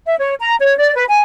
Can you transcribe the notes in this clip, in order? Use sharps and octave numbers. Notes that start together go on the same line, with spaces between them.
E5
C#5
A#5
C#5
D5
B4
G#5